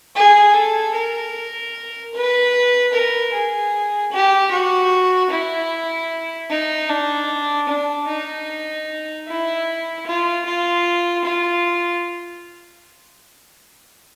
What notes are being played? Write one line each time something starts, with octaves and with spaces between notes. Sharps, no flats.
G#4
A4
A#4
B4
A#4
G#4
G4
F#4
E4
D#4
D4
D4
D#4
E4
F4
F4
F4